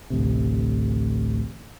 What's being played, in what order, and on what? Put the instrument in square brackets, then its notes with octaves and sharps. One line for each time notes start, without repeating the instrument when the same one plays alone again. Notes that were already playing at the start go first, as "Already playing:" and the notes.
[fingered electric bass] A1 D2 C3